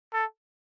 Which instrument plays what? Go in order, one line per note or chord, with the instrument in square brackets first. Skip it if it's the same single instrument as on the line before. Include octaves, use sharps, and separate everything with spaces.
[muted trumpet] A4